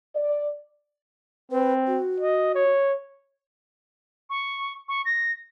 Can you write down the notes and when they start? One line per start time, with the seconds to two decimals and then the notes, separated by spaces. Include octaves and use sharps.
0.16 D5
1.51 C4 B4
1.87 F#4
2.20 D#5
2.55 C#5
4.30 C#6
4.89 C#6
5.05 A#6